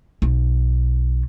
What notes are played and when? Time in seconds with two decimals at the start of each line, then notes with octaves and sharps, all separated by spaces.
0.22 B1